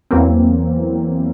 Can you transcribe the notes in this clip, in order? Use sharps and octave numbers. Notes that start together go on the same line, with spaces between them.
E2 E3 F#3 A#3 C4